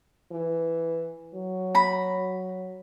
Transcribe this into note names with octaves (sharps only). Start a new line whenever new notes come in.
E3
F#3
A#5 B5